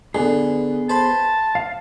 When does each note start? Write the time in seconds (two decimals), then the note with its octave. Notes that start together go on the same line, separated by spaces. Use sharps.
0.15 D3 B3 G#4
0.90 C5 A5 B5
1.55 F5